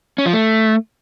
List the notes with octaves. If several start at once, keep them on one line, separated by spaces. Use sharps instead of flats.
C#4
F3
A3